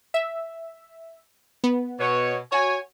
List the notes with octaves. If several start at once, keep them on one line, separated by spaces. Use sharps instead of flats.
E5
B3
B2 C#5
F#4 C#5 G#5